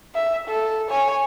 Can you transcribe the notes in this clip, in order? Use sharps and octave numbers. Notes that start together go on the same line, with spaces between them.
E5
A4
C#5 G#5